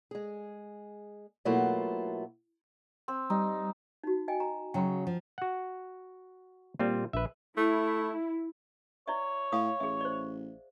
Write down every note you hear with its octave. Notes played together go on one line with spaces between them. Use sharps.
G#3 G#4
B2 F#3 A3 A#3 E4 F4
C4
G3 D#4
D#4 F#4
D#5 G5 G#5
A#5
C#3 F#3 G5 A#5 B5
F3
F#4 F#5
A#2 G3 C4 F4
A#1 B4 E5
A3 E4
E4 C#5 D5 E5
A2 F5 C#6 D#6
A1 G#4 E5
C5 D5